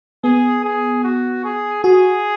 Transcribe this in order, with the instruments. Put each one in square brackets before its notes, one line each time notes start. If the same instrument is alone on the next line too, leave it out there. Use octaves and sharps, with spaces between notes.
[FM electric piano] B3 [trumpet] G#4
[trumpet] G#4
F#4
G#4
[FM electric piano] F#4 [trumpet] G#4